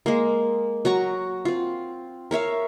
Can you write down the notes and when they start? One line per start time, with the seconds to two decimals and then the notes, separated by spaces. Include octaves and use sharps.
0.06 G#3 A#3
0.85 F#3 F#4 A#5 C#6
1.45 C4 F4
2.31 A#4 C#5 E5 F5